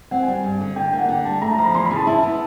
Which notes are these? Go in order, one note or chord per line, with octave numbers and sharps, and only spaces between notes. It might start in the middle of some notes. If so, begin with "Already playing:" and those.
C4 F#5
G#5
G3
G#5
G2
D3
D3 G5
G5
A#3
F#5
D3 G5
G3 A5
A3 A#5
A#5
F3
B5
E2 C6
B5
C#3
A5
E4 A5
B3